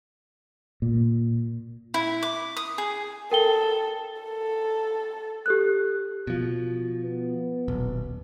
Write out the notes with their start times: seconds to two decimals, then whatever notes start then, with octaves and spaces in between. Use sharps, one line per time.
0.82 A#2
1.94 E4
2.23 D6
2.57 D#6
2.78 G#4
3.31 A4 A#4 G5 G7
4.20 A4
5.46 G4 A4 F#6
6.27 B2 F3
7.01 B3
7.68 D#1 B1